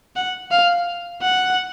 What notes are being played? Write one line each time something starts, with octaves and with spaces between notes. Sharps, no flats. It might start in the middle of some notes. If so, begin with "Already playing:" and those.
F#5
F5
F#5